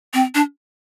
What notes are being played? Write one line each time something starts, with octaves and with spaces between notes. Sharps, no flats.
C4
D4